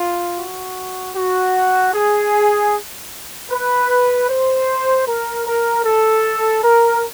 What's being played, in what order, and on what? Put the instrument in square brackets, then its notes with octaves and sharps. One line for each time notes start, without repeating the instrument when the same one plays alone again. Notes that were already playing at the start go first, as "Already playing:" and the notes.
Already playing: [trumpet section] F4
F#4
F#4
G#4
B4
C5
A#4
A#4
A4
A#4